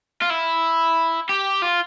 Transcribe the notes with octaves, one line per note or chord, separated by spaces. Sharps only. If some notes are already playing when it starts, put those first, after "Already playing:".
F4
E4
G4
F4